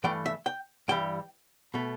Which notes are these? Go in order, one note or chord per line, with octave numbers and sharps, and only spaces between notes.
G2 E3 A3 G5
E5
G5
G2 E3 G3 G5
B2 A3